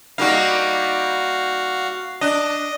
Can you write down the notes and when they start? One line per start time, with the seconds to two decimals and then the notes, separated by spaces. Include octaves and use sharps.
0.18 G3 A#3 D#4 F#4 F5
2.21 D4 D#5